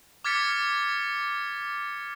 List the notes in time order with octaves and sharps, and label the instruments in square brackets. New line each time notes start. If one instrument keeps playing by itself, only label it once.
[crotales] D6 F6 G#6 A6 B6 C#7